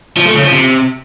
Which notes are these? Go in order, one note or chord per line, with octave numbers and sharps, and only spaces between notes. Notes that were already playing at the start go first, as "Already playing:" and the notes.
F3
A3
C#3
F3
C3